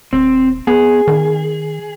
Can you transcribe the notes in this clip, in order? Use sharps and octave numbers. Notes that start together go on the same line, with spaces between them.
D#1 C4
B3 G#4
D#3